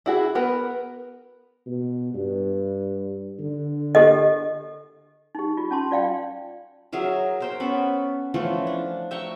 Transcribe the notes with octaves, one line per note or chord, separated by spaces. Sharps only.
E4 F#4 G#4
B3 A#4 B4
B2
G2
D3
G4 A4 D#5
D#4 G4
F4
C#4 A5 C6
F4 D5 F5 G5
F#3 G#4 A#4 E5
A#4 C5 G5
B3 C#4 A4 B5
E3 F3 A3 C#4
D4
E5 G5 A#5 C#6